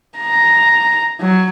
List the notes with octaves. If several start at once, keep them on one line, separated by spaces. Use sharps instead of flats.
A#5
F#3